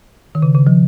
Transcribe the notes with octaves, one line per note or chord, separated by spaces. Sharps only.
D#3
C#3
C#3
F3